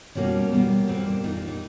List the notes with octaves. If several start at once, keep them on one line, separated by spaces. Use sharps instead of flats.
B2 G3 A#3 C#4
B2 G3 A#3 B3
A#2 G3 A#3 C4
D4
A#2 G3 A#3 D#4
D4
D#4